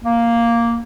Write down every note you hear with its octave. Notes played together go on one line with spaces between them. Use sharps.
A#3